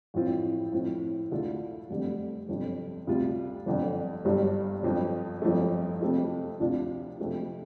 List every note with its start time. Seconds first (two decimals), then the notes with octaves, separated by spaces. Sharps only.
0.14 A1 A2 F3 C4 F4
0.73 A2 F3 C4
1.31 D2 D3 A3 F4
1.90 F1 F2 D3 G3 C4
2.49 G1 F2 C3
3.07 D2 C3 G3 F4
3.66 G1 F2 D3
4.25 G1 G2 G3
4.83 G1 F2 F3 C4
5.42 G1 F2 F3 A3
6.01 F2 C3 A3 C4 F4
6.60 D2 C3 F3 D4 F4
7.19 F2 C3 A3 C4 F4